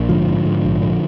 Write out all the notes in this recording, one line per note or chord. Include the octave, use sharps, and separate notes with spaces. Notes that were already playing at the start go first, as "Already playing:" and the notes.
Already playing: A#1
G#2 D3 F3
G#2
G#2
A#1
A#1